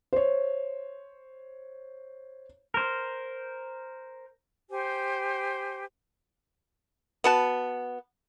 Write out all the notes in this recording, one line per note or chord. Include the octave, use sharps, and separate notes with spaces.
C5 C#5
A#4 C5
G4 C5 G#5
B3 F#4 A5